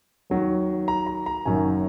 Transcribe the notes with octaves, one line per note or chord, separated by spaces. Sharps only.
D#2 D#3 F#3
A#5
A#5
A#5
F#1 F#2 D#3 F#3 G#5